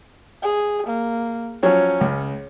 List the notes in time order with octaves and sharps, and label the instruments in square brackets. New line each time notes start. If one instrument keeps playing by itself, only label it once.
[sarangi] G#4
A#3
[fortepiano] F3 F#3 C#5 [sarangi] C#4
[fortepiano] C#2